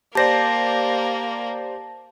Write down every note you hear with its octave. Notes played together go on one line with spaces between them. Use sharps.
A#3 G4 C5 D5 A5 A#6